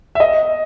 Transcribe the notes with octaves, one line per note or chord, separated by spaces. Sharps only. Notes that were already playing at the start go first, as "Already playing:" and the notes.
E5
D#5